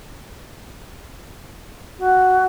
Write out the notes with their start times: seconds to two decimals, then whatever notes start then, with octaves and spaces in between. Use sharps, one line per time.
1.99 F#4